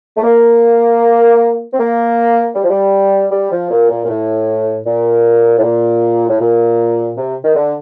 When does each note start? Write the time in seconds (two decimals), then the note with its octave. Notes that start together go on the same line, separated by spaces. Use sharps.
0.17 A3
0.23 A#3
1.73 C4
1.79 A#3
2.55 G3
2.63 F3
2.70 G3
3.32 G3
3.52 F3
3.71 A#2
3.90 A#2
4.05 A#2
4.09 A2
4.86 A#2
5.58 A2
5.63 A#2
6.28 A2
6.40 A#2
7.17 C3
7.45 D#3
7.56 D3